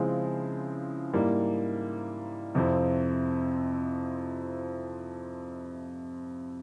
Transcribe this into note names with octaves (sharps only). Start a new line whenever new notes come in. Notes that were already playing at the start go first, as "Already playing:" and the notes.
Already playing: C#3 F3 G#3 C4 E4
G#2 G3 A#3 E4
F2 C3 F3 C4 E4